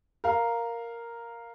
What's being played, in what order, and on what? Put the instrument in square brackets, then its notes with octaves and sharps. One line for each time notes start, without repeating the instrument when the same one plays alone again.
[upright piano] A#4 F5